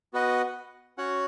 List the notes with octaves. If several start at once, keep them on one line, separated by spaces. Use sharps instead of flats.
B3 F#4 B4 D#5 F#5
C#4 F#4 C#5 F#5